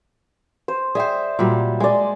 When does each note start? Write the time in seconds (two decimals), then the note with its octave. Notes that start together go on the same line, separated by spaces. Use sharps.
0.68 C5
0.95 G#4 C5 D5 E5 G5
1.39 A#2 F#3 G3
1.80 G#3 D5 G#5